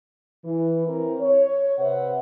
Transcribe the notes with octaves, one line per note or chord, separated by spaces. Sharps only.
E3
E3 C4 A#4
C#5
C3 B4 C5 E5 F#5